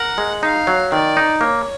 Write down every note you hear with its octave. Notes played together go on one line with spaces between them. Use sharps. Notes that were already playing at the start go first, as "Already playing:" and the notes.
Already playing: A#4 F#5
G#3
D#4 F5
F#3
D#3 D5
D#4
A#3 C#5